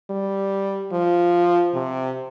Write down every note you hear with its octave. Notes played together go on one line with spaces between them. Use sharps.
G3
F3
C3